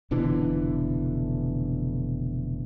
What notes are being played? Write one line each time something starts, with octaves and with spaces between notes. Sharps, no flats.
F1 B2 D3 E3